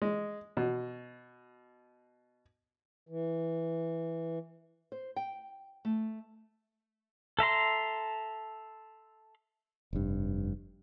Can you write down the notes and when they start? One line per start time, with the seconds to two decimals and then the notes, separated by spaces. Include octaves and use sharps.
0.02 G#3
0.57 B2
3.09 E3
4.92 C5
5.16 G5
5.85 A3
7.39 A4 E5 A#5 C6
9.93 F1 G2